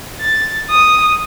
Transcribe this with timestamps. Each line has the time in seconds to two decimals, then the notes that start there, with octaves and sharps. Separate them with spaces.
0.21 A6
0.70 D#6